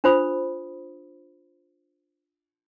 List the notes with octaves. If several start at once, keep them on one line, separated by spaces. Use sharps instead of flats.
D4 F4 C5 B5 D#6